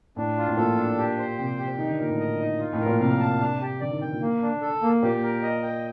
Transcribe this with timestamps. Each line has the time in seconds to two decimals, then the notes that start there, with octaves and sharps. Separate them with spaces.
0.16 A2 D4
0.38 F4
0.48 A2
0.57 A#2 A4
0.77 D4
0.98 G4
1.18 C5
1.38 C3 G5
1.59 G4
1.78 D#3 D#4
1.89 D3
1.99 A#2 A#4
2.09 A2
2.20 D#5
2.40 D#4
2.60 F4
2.73 A2
2.80 A#4
2.86 A#2
3.00 C3 F5
3.20 A5
3.40 D4
3.61 G4
3.80 D3 D5
3.91 D#3
4.01 D#3 G5
4.11 A#2
4.22 A#3
4.42 D4
4.62 A4
4.83 A#3
5.02 A#2 G4
5.23 A#4
5.43 D#5
5.63 G5